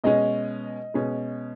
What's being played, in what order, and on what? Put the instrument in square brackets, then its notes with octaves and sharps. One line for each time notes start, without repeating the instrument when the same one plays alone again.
[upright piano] B2 G#3 C#4 [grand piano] D#5
[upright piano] B2 G#3 C#4